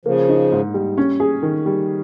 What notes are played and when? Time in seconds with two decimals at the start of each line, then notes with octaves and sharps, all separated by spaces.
0.05 C#3 F3 A#3
0.29 D#4
0.52 G#2
0.74 G3
0.98 C#4
1.20 G#4
1.43 D#3
1.66 G3